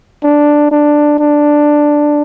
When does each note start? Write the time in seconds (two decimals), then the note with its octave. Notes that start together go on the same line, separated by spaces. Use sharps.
0.24 D4
0.71 D4
1.19 D4